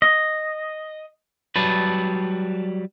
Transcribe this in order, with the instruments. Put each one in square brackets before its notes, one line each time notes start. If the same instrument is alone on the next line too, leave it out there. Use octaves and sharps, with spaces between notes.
[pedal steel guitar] D#5
[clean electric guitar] F#3 G3 B4 [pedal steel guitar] A5